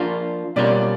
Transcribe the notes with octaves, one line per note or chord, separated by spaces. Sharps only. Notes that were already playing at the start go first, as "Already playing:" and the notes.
Already playing: F3 A#3 D4 F4
B2 G3 A#3 C#4 F4 D5